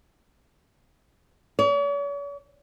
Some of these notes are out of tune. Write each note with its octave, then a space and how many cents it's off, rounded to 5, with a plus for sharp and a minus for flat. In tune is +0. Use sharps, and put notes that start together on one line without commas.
C#5 +45